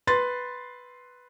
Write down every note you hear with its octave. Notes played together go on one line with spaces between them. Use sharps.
B4 C6 A6